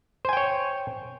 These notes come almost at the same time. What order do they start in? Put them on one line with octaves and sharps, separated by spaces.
C5 G#5 G5 C#5